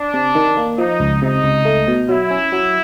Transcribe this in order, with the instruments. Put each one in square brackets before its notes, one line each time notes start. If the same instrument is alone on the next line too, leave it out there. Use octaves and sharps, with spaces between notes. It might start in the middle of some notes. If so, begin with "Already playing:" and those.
Already playing: [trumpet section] D4
[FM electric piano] C3
D#3
A#3
[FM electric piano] F3 [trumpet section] D#4
[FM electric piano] C#2
[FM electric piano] C3 [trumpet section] D#4
[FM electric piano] C#2
A3
B2
[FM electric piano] F#3 [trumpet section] E4
[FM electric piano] C#4
F#3